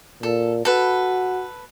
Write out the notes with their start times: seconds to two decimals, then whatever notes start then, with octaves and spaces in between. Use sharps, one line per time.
0.23 A#2 A4
0.65 F#4 A4 B4